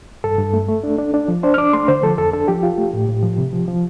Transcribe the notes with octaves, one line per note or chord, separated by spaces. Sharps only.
G2 A4
G2
A3
A3
D4
D4
D4
F3
D4 C5
F6
D4 D6
A3 C6
D3 C5
F3 A4
F2 A4
D4 A4
F3 G4
F4
A3
A2
A2
F3
C3
F3
F3